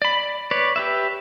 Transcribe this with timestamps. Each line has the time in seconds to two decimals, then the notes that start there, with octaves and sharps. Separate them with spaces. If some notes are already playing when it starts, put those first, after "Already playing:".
0.02 D5 B5
0.51 B4 C#5 D5
0.76 G4 B4 E5